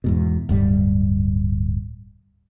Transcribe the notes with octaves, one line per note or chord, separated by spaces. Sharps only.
E2 G#2 B2
D1 G2 G3